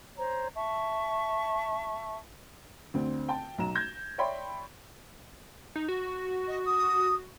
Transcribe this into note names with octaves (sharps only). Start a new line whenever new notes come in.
C5 C#5 A#5
E5 A5 C#6
D2 D3 C4
G5 A5
B1 A#5 E7
G6 G#6 A#6
C#5 D5 E5 G5 B5 C6
D#4
F#4
D#5
D#6